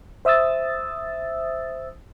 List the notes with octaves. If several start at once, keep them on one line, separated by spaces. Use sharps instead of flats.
C5 E5 D#6 E6 A6